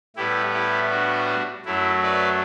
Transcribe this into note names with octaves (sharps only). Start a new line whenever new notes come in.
A2 G3 B3 E4 G4
E4 G4
D4 F#4
F#2 F#3 A3 E4
B4 D5